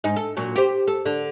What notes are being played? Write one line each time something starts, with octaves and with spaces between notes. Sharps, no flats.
G#2 D#4
A4
A#2 F#3
G4 C5
A4
D3